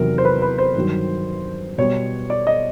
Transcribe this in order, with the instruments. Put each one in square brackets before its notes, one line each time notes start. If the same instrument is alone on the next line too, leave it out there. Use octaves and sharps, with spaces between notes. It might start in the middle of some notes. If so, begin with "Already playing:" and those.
Already playing: [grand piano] E2 C3 D#3 F#3 A#4
C5
B4
B4
C5
G2 D#3 F#3
B2 G3 B3 C#5
D5
D#5